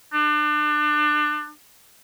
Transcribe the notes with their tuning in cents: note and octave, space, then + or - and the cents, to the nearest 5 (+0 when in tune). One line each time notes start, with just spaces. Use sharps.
D4 +30